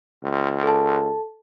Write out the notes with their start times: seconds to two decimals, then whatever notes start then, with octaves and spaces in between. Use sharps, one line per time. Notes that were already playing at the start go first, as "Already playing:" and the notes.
0.24 C#2
0.63 A4 A5